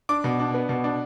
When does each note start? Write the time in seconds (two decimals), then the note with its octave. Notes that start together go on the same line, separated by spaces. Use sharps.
0.09 D4 D6
0.24 B2
0.40 D4
0.54 B3
0.69 B2
0.84 D4